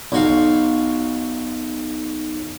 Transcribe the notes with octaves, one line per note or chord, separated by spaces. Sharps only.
B1 F#4 F5